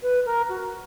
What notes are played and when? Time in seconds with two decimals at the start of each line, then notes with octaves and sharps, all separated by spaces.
0.02 B4
0.25 A#4
0.49 F#4